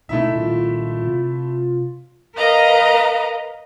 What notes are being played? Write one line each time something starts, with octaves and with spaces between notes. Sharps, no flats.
D2 B2 A3 D#4 E4 E5
A#2 D#3 G#3 F4
C3
A#4 B4 D#5 F5 A#5